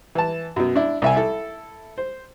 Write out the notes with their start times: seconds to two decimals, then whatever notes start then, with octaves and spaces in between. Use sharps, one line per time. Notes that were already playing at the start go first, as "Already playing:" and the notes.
0.15 E3 A5
0.56 F#2 B2
0.76 D4 E4
1.02 C2 E5 G#5
1.16 E4 A4
1.98 C5